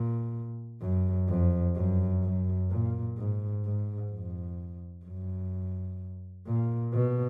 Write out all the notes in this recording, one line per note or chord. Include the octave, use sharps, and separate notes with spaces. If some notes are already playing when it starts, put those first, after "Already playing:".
Already playing: A#2
F#2
F2
F#2
F#2
A#2
G#2
G#2
F2
F#2
A#2
B2